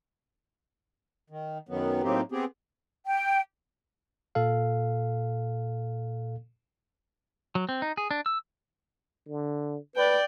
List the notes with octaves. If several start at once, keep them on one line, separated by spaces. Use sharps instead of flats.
D#3
F#2 D#3 F#3 B3
A2 F#3 A#3 C4 D#4 G4
B3 C4 G4 G#4
G5
A#2 A4 F5
F#3
C4
D#4
G#4
D4
E6
D3
B4 D5 G5